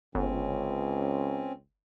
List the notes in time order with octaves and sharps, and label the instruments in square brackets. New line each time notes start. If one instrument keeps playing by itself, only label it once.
[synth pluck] G1 [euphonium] C#2 [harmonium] C4 C#4